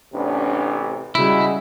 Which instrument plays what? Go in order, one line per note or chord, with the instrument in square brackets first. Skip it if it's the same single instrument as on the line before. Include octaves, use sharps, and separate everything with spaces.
[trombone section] A1 C3 [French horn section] B3 C#4 D4
[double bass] C#3 G3 [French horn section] G#3 F#4 [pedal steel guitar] E4